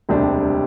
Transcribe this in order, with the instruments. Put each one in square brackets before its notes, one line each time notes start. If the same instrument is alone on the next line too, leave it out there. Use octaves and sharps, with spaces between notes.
[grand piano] E1 D2 C3 G3 D4